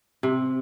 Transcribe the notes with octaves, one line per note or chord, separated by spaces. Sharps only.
C3